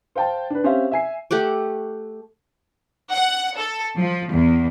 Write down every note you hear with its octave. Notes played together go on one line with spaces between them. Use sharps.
C5 F5 G5 A5
D4 B4
C4 C#4 G4 C5 E5 F5
E5 G#5 C7
A3 G4 F#5 D6
F#5
A4
F3
E2